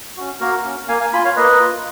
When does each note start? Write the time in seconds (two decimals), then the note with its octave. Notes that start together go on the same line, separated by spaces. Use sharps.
0.17 C#4 F#4
0.40 A#3 F#4 A#4
0.65 C#4 F#4
0.88 A#3 F5 G#5
1.00 F5 G#5
1.13 F4 G#5 B5
1.25 C#5 F5
1.36 A#3 B4 D#5
1.60 F4